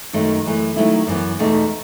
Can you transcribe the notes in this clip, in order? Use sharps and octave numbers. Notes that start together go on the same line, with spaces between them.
F#2 D#3 F#3 A3
F#2 E3 A3
D#3 F#3 A3 E4
F#2 E3 B3
E2 B2 A3 D#4